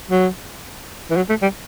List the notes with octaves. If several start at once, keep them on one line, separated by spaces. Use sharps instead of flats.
F#3
E3
F#3
A3
G3